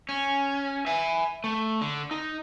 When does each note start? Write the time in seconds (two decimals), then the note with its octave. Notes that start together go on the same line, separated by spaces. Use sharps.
0.09 C#4
0.86 E5 G#5
1.44 A3
1.81 D3
2.11 D#4